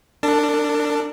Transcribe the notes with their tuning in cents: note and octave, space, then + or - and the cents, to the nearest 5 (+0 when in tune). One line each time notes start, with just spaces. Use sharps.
D4 +5 A#4 -40 A5 +0